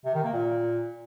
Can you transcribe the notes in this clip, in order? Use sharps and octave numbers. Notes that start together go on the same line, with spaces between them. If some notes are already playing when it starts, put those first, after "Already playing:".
C3
D#3
A#3
A#2